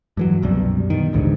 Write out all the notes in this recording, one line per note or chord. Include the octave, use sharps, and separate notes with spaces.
G2 E3 F#3
C2 F#2 B2 G3
B2 D#3
A1 D2 G#2 D3